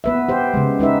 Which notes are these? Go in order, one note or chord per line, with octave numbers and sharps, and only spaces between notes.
B3 B4 E5
G4 C5
C#3 G#3
G#3 D#4 B4 E5